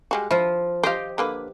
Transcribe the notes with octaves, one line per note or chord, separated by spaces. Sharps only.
G3 G#3 F#4
F3 E4 F4
G4 C5 D#5 F5 G5
D3 A#3 B4